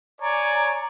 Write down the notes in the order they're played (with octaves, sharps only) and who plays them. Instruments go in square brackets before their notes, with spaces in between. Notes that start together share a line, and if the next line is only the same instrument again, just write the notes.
[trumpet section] C#5 D5 G#5 [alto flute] A#5